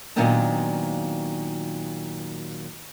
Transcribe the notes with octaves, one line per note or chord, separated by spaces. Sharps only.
A#2 D#3 F#3 B3 C4 D4